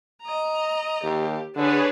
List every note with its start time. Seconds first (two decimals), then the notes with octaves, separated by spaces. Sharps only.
0.22 D#5 A#5
1.03 D#2 G4
1.56 D3 D4 G#4 B4 C#5